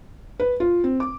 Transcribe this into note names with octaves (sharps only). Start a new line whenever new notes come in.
B4
F4
C4
D6